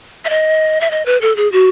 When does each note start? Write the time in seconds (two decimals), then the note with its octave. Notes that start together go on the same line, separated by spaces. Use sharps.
0.25 E5
0.30 D#5
0.81 E5
0.91 D#5
1.06 B4
1.21 A4
1.36 G#4
1.52 F#4